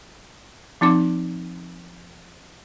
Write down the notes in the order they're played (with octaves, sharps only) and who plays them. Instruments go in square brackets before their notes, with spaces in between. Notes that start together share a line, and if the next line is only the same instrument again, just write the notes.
[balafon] F3 C4 D#4 D6